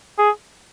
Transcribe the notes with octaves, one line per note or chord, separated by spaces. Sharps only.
G#4